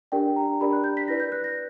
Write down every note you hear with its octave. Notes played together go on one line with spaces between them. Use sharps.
D4 G4 A#4 D5 G5
A#5
D4 G4 A#4 D5 B5
F#6
G6
B6
E4 B4 D5 A#6
G6
F#6
A#6